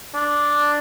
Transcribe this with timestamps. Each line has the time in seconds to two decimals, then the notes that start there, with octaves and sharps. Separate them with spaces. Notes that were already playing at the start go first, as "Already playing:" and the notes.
0.14 D4